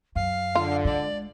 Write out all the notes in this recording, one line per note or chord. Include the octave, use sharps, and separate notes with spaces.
F#2 F5
D3 F4
G#3 D5